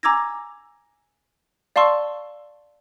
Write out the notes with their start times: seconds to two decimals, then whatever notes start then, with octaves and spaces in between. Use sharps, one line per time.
0.03 G#5 A#5 D6 E6 G#6 A#6
1.76 D5 F5 A5 C6 C#6 E6